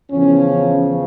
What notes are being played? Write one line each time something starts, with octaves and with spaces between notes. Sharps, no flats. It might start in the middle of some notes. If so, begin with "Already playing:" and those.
E2 C#3 F3 C#4